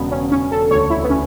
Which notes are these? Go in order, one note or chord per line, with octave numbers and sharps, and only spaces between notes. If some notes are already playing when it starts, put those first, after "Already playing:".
Already playing: E1 C#3 B3
C#4
E1 C#4
A4
D2 C#5
E4
B3
C#4